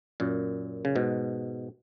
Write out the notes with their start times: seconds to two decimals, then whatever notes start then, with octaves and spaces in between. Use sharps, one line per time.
0.20 F#2 A#2
0.85 C#3
0.96 G#2 B2